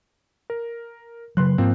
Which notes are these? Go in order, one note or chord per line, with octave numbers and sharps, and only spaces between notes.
A#4
C#3 F#3 B4 C6 F#6
G#2 F3 A#3 C4